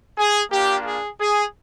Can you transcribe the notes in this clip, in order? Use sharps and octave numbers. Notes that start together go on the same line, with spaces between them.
G#4
A#3 D4 F4 G4
G#4
G#4